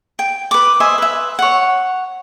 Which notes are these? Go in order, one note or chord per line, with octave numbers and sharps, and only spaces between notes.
G5
B4 D6
C5 D#5 E5 G#5
B4 E5
C#5 F#5